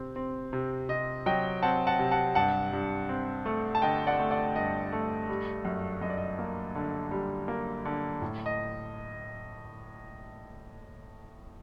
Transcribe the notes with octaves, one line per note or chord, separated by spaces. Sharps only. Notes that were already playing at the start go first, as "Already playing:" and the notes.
Already playing: C3 C4
C4
C3
C3 D#5
F#3 D#5 G5
C4 F#5 A5
F#5 A5
C3
F#5 A5
G2 F#5 A5
G2
C4
A3
A5
D3 D#5 G5
D5 F#5
A3
D5 F#5
G2 D#5
A3
G3
F#2
F#2 D#5
D5
D#5
A#3
D3
G3
A#3
D3
A2
D#5